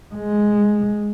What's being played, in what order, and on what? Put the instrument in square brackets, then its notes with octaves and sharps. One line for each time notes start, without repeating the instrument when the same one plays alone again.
[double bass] G#3